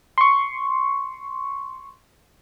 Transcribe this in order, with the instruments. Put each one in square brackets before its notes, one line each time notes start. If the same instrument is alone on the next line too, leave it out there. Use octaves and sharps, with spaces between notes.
[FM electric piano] C6 C#6